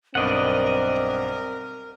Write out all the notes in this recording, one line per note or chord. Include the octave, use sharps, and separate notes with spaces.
B1 G2 C4 A#4 D5 D#5 F#5